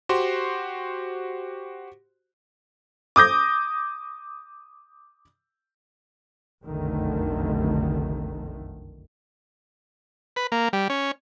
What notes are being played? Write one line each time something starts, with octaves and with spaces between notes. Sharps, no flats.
F#4 G4 C5 C6
D6 D#6 G6 A#6
F1 B1 F#2 D3 D#3 A3
B4
A#3
G3
C#4